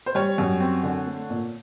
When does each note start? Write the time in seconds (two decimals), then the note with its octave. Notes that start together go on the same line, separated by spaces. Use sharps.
0.06 C5
0.15 G3 C#5
0.38 F#2
0.60 C4
0.83 D3
1.07 A3
1.30 A#2